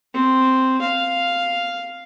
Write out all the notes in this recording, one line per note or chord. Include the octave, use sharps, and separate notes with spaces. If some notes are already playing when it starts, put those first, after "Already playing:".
C4
F5